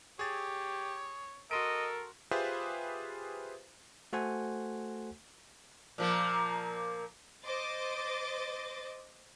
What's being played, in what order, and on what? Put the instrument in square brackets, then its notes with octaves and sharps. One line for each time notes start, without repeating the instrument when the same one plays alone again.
[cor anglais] G4 [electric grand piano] G#4 A6 [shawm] C#5
[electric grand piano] F#4 C6 D7 [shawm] A4 [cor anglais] A#4 [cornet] D#5
[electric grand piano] F4 G4 G#4 B4 C5 E5
[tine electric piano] A3 F#4 A4 C5 F#5 G#5
[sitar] A#2 F3 A#3
[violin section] C5 D#5 D6 A6